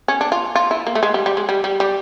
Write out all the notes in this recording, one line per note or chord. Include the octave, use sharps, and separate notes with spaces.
C#4
D4
F4
F4
E4
A#3
A3
G#3
G3
G3
G#3
G3
G3
G3